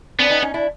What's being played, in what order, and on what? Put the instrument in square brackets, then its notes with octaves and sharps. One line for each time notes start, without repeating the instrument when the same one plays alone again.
[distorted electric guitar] B3 [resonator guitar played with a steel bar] C4 D4
[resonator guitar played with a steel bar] C#4 D#4
C#4 D#4
D4 E4